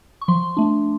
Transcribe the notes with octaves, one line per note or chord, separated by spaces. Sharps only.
C#6
F3 C6
A3 D4